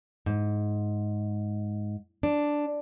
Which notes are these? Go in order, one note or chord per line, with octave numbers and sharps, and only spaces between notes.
G#2
D4